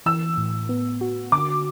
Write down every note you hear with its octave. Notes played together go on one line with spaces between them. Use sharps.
E3 E6
A2
B3
F#4
D3 D6